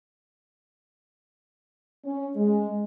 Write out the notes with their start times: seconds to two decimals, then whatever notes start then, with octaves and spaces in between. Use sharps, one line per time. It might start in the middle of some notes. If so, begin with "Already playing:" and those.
2.05 C#4
2.37 G#3